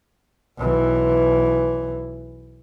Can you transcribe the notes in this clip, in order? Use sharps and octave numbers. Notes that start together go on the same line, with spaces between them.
B1 E3